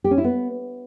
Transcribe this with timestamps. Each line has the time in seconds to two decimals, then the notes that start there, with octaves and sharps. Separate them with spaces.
0.04 G4
0.11 C#4
0.18 E4
0.24 B3